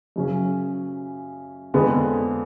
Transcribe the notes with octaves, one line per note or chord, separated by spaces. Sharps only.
F#2 C#3 F#3 C#4
F2 D3 F3 G#3 B3